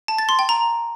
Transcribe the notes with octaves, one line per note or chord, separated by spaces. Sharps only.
A5
A6
C6
G5
A#5